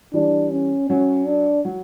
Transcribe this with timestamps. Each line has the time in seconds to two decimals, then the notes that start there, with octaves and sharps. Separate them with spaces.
0.13 E3 G3 D4
0.51 C#4
0.90 F#3 C#4
1.27 D4
1.65 F#3